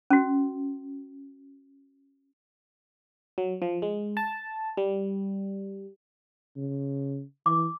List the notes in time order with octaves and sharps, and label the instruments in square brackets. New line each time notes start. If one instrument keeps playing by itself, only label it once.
[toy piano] C#4 F#4
[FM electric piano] F#3
F3
G#3
A5
G3
[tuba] C#3
[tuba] E3 [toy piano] D6